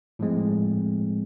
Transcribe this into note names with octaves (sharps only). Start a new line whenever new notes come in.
A2 F3 G#3 C4